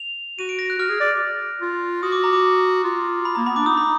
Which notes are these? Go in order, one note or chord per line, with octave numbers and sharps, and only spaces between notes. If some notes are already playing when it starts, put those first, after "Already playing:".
Already playing: F7
F#4 D#7
D7
A#6
F#6
F#4 F6
G#4
D5
F4
F#4 D#6
D6
A#5
D6
F4
B5
A#3 A#5
B3 B5
D4 D6
D#4 D#6
B5